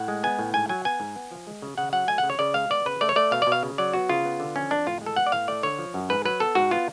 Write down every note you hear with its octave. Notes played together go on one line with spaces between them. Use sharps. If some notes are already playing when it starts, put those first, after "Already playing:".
Already playing: A2 F#5
G#3
B3 G#5
A2
G#2 G#5
F#3 G#5
B3 G#5
G#2
B3
F3
G#3
C#3
C#3 F#5
F#3 F#5
A3 G#5
F#5
C#3
C#5
C#3 D5
G#3 F5
B3 D5
C#3 B4
A3 D5
C#5
A3 D5
B2 F5
B2 D5
F5
C#3
F#3 D5
B3 F#4
C#3 F4
B3
D3
F3 C#4
F2 D4
A2 F4
G#3
A4
B3 F#5
D5
A2 F5
A3 D5
D3 C#5
F3
F#2
G#2 B4
F#3 B4
B3 A4
G#2 F#4
B3 F4